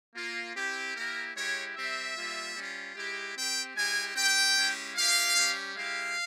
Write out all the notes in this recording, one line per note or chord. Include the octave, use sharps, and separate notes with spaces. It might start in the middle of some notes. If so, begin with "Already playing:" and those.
A#3 F4
C4 E4 G4
A#3 E4 G4 A#4
G#3 E4 G4 C#5
G3 C4 G4 E5
G3 A#3 F4
G3 C#4 F4
G#3 E4 G4
C4 G4 G5
G#3 E4 G4 G#5
C4 G4 G5
G#3 C#4 E4 G4
C4 E4 G4 F5
G3 C#4 G4
G#3 E4 G4 F5